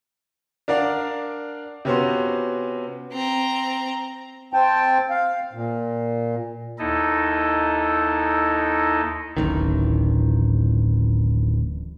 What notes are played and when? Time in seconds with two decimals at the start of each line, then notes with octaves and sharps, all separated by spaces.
0.68 D4 A#4 D5 F5 F#5 D6
1.85 C3 B3 C#4 F4 F#4 C5
3.13 C4 A#5
4.53 C4 G5 A5
5.10 F5
5.53 A#2
6.79 D#2 D#4 E4 A4 D#5
9.37 D1 A1 D#3